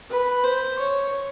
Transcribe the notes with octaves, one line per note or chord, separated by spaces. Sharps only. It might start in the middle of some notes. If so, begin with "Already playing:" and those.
B4
C5
C#5